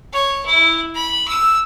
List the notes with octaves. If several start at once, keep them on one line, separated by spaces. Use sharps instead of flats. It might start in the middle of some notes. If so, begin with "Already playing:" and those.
C#5
E4
B5
E6